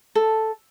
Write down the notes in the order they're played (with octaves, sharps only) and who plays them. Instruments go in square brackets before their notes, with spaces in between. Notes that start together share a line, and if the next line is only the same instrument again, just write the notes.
[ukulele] A4